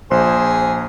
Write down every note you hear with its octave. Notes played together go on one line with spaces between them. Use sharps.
A#1 G#4 C5